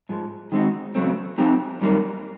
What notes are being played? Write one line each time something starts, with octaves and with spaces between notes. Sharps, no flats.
G#2 F3 G#3
D#3 G#3 C4 D#4 F#4
E2 C#3 F#3 A3 C4
F3 A3 C4 D#4 G4
F#2 D#3 G3 A#3